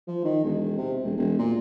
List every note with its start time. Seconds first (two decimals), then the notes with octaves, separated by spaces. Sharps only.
0.08 F3
0.24 D#3
0.44 E1
0.77 C3
1.04 E1
1.17 E1
1.38 A#2